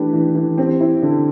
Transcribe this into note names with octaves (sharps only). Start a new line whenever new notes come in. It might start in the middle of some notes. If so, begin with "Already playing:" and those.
Already playing: E3 A3 D4 G4 B4
E3
E3
C4 G4
E4
D3